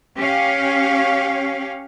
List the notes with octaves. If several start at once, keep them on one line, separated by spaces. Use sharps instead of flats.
C#4 G4 C#5 F5